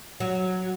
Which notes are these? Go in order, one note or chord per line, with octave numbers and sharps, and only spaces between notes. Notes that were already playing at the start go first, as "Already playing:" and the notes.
F#3